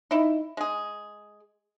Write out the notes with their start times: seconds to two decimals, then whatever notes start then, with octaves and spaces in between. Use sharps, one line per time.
0.11 D#4 E4
0.57 G#3 G#4